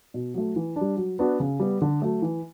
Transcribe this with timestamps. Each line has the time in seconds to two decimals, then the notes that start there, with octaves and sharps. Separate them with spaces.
0.14 B2
0.34 F#3 A3
0.56 E3
0.76 D4
0.81 G3
0.97 F#3
1.19 B3 D4 F#4
1.40 C#3
1.60 G3 B3
1.82 D3
2.02 F#3 A3
2.22 E3